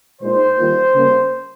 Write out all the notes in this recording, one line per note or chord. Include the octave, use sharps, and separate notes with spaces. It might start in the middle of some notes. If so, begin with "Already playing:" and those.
A#2 G#3 D#4 C5
D#3 G3 A#3 F4
C#3 G3 A#3 C#4